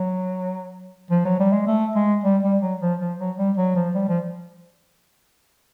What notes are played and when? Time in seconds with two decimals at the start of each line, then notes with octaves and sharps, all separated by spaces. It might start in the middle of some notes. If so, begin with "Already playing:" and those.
Already playing: F#3
1.11 F3
1.25 F#3
1.40 G3
1.53 G#3
1.67 A3
1.95 G#3
2.24 G3
2.43 G3
2.62 F#3
2.81 F3
3.00 F3
3.19 F#3
3.38 G3
3.57 F#3
3.76 F3
3.95 G3
4.09 F3